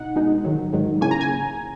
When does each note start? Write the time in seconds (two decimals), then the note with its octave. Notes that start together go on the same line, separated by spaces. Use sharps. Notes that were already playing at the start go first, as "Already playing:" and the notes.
Already playing: B2 D#4 F#5
0.16 B2 G#3 D#4
0.45 G#2 D#3 F#3
0.73 G#2 D#3 F#3
1.01 C#3 E3 A#3 C#4 G#5
1.11 A#5
1.21 G#5